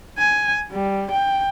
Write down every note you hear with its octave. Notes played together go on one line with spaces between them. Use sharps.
G#5
G3
G5